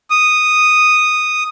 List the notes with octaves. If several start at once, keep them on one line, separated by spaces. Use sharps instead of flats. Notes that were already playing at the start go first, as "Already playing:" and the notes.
D#6